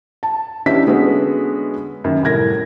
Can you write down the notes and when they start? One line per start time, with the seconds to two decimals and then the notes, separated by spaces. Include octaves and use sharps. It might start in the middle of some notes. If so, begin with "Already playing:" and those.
0.23 A5
0.66 E3 C#4 D4 G4 E5 B6
0.86 D3 G#3 B3 C#4 F#4 B4
2.04 F#2 D#3
2.23 C2 A2 A#4 G#6 A#6